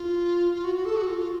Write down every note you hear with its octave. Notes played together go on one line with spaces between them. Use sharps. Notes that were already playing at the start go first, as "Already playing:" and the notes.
Already playing: F4
F4
F#4
F#4
A4
F#4
F4
F4